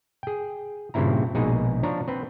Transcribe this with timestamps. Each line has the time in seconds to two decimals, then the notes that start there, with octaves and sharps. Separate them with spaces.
0.23 G#4 G5
0.94 G2 A#2 C#3 C4 E4 A#5
1.35 A#1 B2 G#3 D#4 G#4
1.83 F3 D4 C#5 A#5
2.08 C4 B4